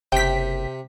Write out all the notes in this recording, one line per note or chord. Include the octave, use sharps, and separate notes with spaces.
F#1 C3 G5 B6